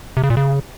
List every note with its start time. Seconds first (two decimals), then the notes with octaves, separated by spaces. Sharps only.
0.17 C3
0.23 C#3
0.30 A#2
0.37 C#3